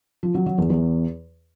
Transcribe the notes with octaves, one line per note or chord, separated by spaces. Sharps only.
F3
F#3
F#3
E2
E2